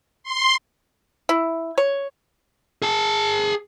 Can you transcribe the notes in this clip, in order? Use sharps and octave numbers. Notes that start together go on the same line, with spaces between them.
C6
E4
C#5
G#4 A5